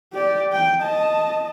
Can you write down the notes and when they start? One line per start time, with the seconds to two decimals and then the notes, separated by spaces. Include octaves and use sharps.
0.13 G4 D5
0.53 G5
0.82 D#5 A5